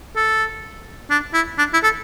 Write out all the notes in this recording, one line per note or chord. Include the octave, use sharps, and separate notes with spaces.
A4
D4
E4
D4
E4
A4